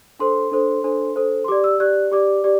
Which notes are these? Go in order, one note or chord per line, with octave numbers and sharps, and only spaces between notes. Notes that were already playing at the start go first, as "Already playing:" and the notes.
D4 A4 C5 C6
D4 A4 C5
D4 A4 C5
D4 A4 C5
C6
G4 D5 D6
E6
G4 D5 F#6
G4 D5 D6
G4 D5